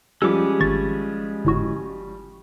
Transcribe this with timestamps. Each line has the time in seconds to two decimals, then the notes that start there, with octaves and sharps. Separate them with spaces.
0.22 F3 G3 G#3 C#4 A4 D6
0.60 G#1 C#6 A6
1.45 G1 A2 F#4